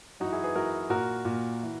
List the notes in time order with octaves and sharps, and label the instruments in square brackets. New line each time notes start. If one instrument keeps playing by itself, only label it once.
[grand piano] F#2 E3 D#4 F#4
E4 G#4
G#4 B4
F#2 E3 F#4 A#4
A#2 F#4 A#4
A#2
E3